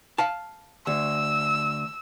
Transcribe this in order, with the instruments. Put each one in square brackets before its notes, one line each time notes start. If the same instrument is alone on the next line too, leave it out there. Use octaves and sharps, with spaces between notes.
[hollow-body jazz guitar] F5 A5
[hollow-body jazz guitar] D2 [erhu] E6